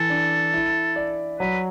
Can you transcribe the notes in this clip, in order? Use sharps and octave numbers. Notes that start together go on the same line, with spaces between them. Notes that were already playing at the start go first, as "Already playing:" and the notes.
Already playing: E3 A4
D4
E4
D5
F#3 B4